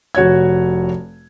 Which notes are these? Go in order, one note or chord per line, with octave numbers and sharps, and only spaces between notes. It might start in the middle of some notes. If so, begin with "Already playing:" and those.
F1 F#4 C#5 G#6